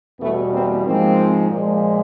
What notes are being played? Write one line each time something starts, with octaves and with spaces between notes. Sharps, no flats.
E2 B2 G3 A3 B3
A#3 C4
G#2 F3 G#3 A#3 C4
A#2 F3 G#3